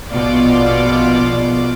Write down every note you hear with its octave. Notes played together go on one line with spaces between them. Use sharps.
A#1 B2 F4 D5 D6